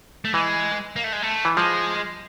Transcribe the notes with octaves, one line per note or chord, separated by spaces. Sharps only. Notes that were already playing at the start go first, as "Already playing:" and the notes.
A3
E3 G#3
A#3
A3
G#3
A3
E3
F3 G#3